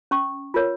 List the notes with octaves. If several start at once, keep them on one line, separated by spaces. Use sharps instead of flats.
C#4 C#6
F4 A#4 C#5